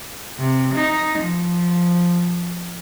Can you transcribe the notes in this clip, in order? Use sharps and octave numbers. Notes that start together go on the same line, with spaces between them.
C3
D#4
F3